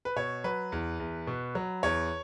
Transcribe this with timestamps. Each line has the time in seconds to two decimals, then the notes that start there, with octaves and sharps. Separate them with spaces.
0.05 B4
0.16 B2 C#5
0.44 F#3 B4
0.72 E2
1.00 E2
1.27 B2
1.55 F#3
1.83 E2 C#5